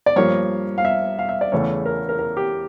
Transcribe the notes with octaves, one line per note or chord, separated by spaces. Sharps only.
D5
G2 F3 A#3 C#5
F5
E5
F5
E5
D5
E2 C#3 E3 A3 C#4 C#5
A#4
A#4
A#4
G4